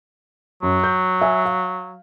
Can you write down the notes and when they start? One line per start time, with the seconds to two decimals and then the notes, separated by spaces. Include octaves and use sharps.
0.63 F#2 F#3
0.84 G6
1.21 E5 G#5
1.45 F5